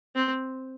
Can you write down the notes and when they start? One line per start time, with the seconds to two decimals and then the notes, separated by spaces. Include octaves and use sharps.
0.15 C4